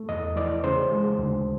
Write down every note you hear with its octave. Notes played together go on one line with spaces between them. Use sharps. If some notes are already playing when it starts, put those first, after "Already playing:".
Already playing: A3
E2 D#5
E3 D5
C#3 C5
G#3
D2